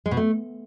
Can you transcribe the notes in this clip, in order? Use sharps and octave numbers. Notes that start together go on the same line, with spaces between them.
G#3
B2
A3